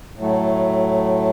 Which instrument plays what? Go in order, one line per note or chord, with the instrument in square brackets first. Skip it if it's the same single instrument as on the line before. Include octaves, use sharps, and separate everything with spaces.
[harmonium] A2 F#3 A3